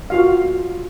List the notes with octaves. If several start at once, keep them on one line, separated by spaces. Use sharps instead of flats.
F4 F#4 F5